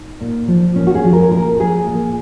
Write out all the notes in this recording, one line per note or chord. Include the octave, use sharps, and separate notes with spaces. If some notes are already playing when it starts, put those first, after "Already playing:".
Already playing: D#4
A#2
F3
A#2 C#4
F#4
G#4
F3
A#4
A#2 A#4
F3 G#4
A#2